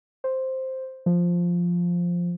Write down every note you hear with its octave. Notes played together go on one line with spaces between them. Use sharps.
C5
F3